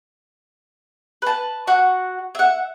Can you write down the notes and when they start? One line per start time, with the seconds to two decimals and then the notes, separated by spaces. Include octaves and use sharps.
1.22 B4 A5
1.67 F#4 F#5
2.35 E5 F#5